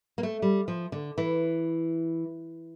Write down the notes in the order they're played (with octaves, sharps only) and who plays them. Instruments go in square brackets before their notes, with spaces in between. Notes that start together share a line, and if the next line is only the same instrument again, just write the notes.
[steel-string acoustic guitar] A#3
A3
G3
F3
D3
E3